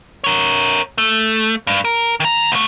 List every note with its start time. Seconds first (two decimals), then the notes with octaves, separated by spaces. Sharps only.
0.24 A#4 C#5
0.98 A3
1.67 G2
1.85 A#4
2.20 D#3 A#5
2.52 C2 A3